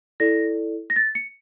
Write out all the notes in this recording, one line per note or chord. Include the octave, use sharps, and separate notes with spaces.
E4 A4 D5 A#6
A#6
A6
C#7